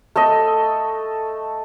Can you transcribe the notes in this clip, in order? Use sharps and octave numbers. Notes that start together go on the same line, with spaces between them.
A3 A4 D#5